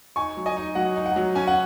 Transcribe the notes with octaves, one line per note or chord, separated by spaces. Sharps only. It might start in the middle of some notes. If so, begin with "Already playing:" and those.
D#4 G#5 C#6
F#3
D#5 G#5
D#4
F#3 F#5
D#4
F#5
F#3
C#4 G#5
F#5